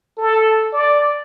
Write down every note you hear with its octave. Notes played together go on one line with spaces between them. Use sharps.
A4
D5